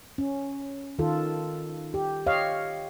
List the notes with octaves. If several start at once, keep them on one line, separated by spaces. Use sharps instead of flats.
C#4
D#3 F4 A4
G4
G4 C#5 D#5 F5